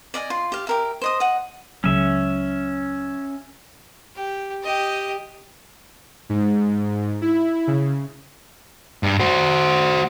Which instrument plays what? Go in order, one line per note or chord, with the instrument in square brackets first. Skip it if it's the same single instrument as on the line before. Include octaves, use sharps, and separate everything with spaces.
[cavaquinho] D5 D#5 F5 G#5
F4 C6
G4 F5
G4 A#4 E5
C5 D#5 D#6
D#5 F#5
[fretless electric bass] C#2 C#3 F#3 [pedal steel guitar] C#4 E5
[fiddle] G4
G4 D#5
[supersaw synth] G#2
E4
C#3
[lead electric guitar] G2
F#4 C5